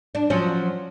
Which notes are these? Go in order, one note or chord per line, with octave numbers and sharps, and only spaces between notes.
D4
F3 F#3 C#4